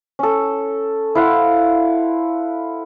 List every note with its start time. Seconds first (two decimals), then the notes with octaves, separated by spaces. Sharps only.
0.19 C#4 A4
1.15 E4 C5 F5 F#5